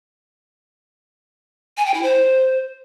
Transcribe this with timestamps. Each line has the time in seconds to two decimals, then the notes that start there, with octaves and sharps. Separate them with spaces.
1.77 G#5
1.86 G5
1.94 E4
2.03 C5